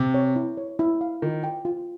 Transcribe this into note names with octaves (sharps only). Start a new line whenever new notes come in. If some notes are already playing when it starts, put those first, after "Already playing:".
Already playing: C3
C#5
E4
C#5
E4
F5
D#3 F4
G5
F4